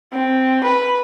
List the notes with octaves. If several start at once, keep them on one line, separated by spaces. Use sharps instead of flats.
C4
B4